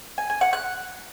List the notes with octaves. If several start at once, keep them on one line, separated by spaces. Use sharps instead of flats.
G#5
G#5
F#5
F#6